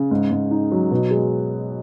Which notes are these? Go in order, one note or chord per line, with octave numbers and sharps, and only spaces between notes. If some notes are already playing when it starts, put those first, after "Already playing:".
Already playing: C#3
G#2
G#2
D#4
F#3
B2
G#3